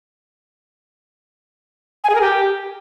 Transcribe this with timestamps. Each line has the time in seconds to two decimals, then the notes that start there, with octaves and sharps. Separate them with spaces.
2.04 G#5
2.10 G#4
2.15 A#4
2.21 G4